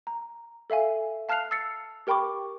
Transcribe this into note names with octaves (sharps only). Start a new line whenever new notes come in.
A#5
A4 E5 F5 G#5
F5 A5 F6 F#6 C7 F7
E6 A6 C7 C#7
G4 A#4 G5 B5 C#6 D6